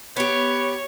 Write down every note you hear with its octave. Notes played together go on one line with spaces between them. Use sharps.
B3 G4 C#5